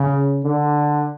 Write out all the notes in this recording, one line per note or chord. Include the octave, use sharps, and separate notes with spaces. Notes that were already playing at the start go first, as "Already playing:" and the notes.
Already playing: C#3
D3